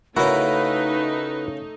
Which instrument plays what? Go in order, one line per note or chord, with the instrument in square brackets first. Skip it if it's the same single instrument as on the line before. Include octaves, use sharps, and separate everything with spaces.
[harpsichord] C#3 A#4 [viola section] A3 D#4 [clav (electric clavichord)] E4 F#4 [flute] B4